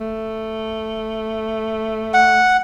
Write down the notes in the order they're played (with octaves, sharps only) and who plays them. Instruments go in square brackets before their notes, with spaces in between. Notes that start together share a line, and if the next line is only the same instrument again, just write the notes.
[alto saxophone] A3
[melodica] F#5